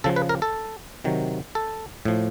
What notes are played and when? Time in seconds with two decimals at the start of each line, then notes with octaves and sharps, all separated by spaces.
0.04 C#3 F3 A4
0.16 B4
0.29 A#4
0.42 A4
1.04 C3 D#3 F#3
1.55 A4
2.05 A2 F3